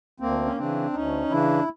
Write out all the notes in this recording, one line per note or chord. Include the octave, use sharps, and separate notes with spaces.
D2 A#3 C4
C#4
C#3 E3 C4 D4
D2 C#4 D#4
C#3 E3 D4 E4